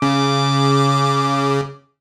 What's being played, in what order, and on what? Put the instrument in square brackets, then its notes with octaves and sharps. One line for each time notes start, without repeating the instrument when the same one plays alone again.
[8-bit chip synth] C#3 [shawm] D6